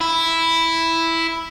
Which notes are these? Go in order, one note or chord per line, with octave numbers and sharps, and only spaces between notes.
E4